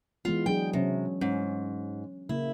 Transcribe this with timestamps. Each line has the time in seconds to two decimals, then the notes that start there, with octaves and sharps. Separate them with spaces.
0.25 E3 G#3 B3 F4
0.46 F#3 D4 G#4 G5
0.73 C3 F#3 C#4
1.21 G#2 C#4
2.29 C#3 A#3 E4